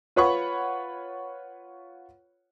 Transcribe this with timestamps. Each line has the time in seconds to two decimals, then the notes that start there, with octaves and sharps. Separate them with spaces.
0.16 F4 B4 C#5 F#5 B5 C#6